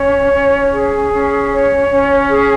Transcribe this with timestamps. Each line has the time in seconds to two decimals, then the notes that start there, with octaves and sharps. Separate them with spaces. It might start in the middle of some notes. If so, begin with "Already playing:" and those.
Already playing: C#4 C#5
0.32 C#4
0.73 G#4
1.12 C#4
1.51 C#5
1.90 C#4
2.29 G#4